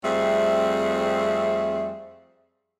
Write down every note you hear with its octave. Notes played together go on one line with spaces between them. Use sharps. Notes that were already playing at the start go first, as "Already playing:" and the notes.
F2 G3 A3 C4 G#4 E5